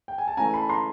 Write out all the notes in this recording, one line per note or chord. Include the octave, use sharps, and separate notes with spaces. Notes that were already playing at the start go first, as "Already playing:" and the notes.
G5
G#5
A5
E3 A3 C#4 G#5 A#5
A5 B5
A#5 C6